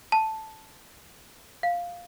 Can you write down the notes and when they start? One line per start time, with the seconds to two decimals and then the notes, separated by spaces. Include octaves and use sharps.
0.12 A5
1.63 F5